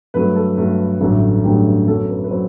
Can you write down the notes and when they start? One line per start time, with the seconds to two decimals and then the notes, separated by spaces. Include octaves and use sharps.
0.14 G2 F#3 A3 B4
0.36 A4
0.57 G2 F#3 A3
1.01 A1 G2 D3 F#3 A3
1.44 A1 G2 D3 F#3 A3 G4
1.87 F#2 F#3 B3 A4
2.09 B4
2.24 B4
2.31 F#3 B3 C5